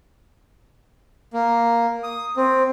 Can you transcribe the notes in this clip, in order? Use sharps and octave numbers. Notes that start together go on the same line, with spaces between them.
A#3
D#6
C4